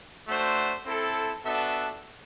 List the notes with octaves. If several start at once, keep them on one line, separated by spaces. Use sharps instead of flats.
A3 D4 F#4 C5
C4 E4 A4
B3 D4 F#4 A4 E5